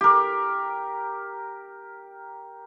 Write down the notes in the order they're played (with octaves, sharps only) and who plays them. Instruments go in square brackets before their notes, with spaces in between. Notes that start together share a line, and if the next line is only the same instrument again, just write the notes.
[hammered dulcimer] G4 A#4